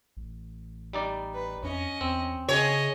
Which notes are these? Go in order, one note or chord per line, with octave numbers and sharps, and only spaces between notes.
A1
G3 D#4 D5
B4
F2 C#4 D#5
E2 C4
C#3 G#4 C#5 D#5